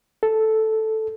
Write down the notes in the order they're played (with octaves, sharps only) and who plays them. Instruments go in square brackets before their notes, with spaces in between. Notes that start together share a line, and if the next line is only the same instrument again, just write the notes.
[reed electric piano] A4